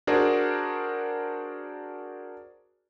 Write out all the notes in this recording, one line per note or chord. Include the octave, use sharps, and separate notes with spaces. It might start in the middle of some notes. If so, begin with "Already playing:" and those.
D4 F#4 G#4 A#4 C5 D5